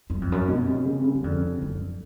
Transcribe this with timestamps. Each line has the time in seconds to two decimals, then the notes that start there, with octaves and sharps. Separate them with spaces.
0.10 F#2
0.21 F2
0.32 F#2
0.48 B2
0.66 C3
0.85 C#3
0.99 C3
1.04 C#3
1.15 F#2
1.23 F2 D3
1.62 F#2